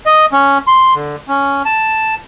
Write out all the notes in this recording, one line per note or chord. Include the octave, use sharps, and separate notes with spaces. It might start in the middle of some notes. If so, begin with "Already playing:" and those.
D#5
C#4
C6
D3
C#4
A5